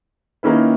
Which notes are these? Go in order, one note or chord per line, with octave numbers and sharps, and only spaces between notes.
D#3 A#3 C#4 E4 B4